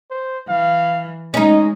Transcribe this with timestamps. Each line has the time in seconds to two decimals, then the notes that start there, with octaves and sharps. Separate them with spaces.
0.10 C5
0.49 E3 F5
1.34 G#3 C#4 D#4 D#5